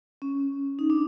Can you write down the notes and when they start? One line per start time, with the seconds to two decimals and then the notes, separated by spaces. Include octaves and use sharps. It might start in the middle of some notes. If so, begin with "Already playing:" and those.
0.22 C#4
0.79 D#4
0.90 D4